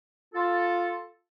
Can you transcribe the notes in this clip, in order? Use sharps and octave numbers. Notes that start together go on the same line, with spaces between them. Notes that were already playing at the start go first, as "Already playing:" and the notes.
F4 A4